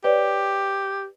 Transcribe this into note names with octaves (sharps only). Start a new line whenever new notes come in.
G4 B4 C#5 D5